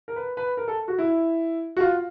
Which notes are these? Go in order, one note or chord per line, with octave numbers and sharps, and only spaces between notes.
A#4
B4
B4
A#4
A4
F#4
E4
F#4
F4